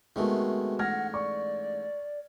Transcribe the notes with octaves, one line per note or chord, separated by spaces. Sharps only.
C3 D#3 G#3 A3 B3 F#4
A1 G#2 F#5 F6 G#6 A#6
D5 C#6